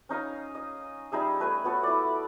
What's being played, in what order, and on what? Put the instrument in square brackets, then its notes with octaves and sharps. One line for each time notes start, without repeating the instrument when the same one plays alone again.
[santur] C#4 D#4 F5 G#5
D#5
G3 D#4 G#4 E5
A3 B4 E5 G#5
B3 F#4 A4 C#5
E4 D5